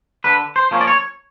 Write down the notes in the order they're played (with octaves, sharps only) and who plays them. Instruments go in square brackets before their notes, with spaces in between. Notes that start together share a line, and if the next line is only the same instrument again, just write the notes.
[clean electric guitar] D3 B4
C5
F3 A#3 C#4
D5
C#5